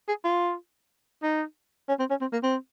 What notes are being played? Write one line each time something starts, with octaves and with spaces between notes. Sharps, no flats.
G#4
F4
D#4
C#4
C4
C#4
C4
A#3
C4